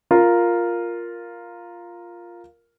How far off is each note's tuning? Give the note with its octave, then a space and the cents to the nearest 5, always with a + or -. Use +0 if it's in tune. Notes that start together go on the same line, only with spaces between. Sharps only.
F4 +0 A#4 +0